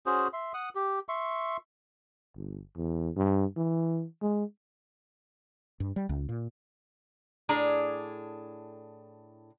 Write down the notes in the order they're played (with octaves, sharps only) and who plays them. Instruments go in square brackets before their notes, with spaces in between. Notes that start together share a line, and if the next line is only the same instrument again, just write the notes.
[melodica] C#4 F#4 G#4 C5
E5 C6
F#5 D#6
G4
E5 C6 C#6
[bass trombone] G1
E2
G2
E3
G#3
[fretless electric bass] G2
G3
C#2
A#2
[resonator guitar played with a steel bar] A2 D4 G#4 A#5